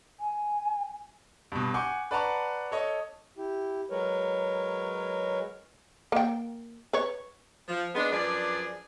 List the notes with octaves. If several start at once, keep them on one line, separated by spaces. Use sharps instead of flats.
G#5
G2 B2
F#5 G#5 C#6 D6 G6
B4 D5 F#5 A5 A#5 C#6
A4 C#5 D#5
E4 G4
F#3 G#3 A#4 B4 C#5
A#3 G5
B4 C#5
F3
G#3 B3 D4
F#2 F3 D4 G#4 B4 D5